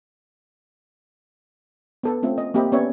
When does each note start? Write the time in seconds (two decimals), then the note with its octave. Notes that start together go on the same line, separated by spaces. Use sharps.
2.03 B3 A4 B4
2.23 A3 C4 C#4 F4 E5
2.38 D#5
2.54 A#3 C4 G4 D#5 E5 B5
2.72 B3 C#4 G4 C#5 D5 E5